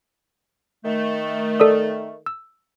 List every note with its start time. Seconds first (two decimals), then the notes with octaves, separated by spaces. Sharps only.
0.85 D#3 A3
1.60 A4 D5 D#6
2.26 E6